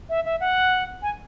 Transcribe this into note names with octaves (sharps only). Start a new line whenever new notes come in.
E5
E5
F#5
G#5